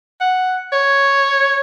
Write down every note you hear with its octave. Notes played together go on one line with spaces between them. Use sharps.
F#5
C#5